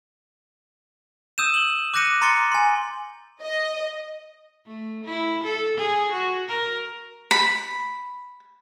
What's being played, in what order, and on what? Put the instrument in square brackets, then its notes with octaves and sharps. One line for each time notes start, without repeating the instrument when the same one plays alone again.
[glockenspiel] D#6 E6 G6 D#7 E7
F#7 G7
D6 F#6 G6 A#6 C#7 D#7
A#5 C6 D6 A6 C#7 G7
G#5 C6
[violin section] D#5
[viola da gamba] A3
E4
A4
G#4
F#4
A#4
[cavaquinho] B5